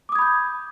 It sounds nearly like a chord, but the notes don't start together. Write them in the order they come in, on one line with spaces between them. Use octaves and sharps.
D6 D#6 G#6 B5 G6